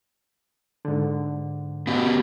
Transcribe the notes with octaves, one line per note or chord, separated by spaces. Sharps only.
G#2 D3
B3 F#4 G4